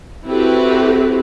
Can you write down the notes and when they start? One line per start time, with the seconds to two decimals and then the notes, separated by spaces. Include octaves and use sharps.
0.25 C4 E4 F#4 G4 A4 B4